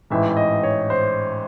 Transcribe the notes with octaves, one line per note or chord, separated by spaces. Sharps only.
A1 G#2 E3 E5
D#5
C#5
C5